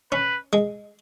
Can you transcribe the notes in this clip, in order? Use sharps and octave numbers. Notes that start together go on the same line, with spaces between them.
C#4 B4
G#3